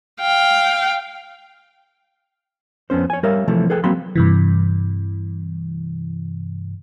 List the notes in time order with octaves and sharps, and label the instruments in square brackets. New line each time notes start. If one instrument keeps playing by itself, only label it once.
[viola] F5 G5
[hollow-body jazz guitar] F2 B3 C#4 C5
C#5 G#5
G3 A#4 C#5 E5 F5
C3 E3 F3 A3
G#4 A4 B4 G5
F#3 A#3 C4 B5 C6
[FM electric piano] G2 C3 E3